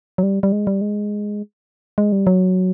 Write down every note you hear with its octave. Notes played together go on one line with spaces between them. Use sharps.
F#3
G3
G3
G#3
G3
G#3
G#3
G3
F#3